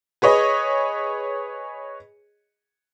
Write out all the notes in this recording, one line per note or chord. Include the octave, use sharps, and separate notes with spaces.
G#4 B4 C#5 D#5